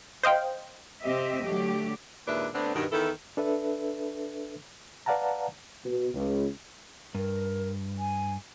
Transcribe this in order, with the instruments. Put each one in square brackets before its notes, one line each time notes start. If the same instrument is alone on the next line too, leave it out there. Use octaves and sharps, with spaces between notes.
[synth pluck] C5 D#5 F5 G5
[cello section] C3 C4 G4 D#5 E5
D3 F#3 A3 G4
[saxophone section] D#2 A#2 G#3 D4 B4 E5
D3 A3 B3 C4 D4
G2 B2 D#3
E2 D#3 B3 E4 A4
[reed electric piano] D4 A4 B4 E5
B4 D5 F5 F#5 A5 A#5
[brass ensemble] B2
C#2
[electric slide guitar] G2 [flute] A#4
[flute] G#5